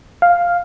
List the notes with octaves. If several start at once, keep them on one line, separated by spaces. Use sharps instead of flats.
F5